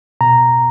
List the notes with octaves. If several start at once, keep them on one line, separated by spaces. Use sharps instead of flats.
B2 A#5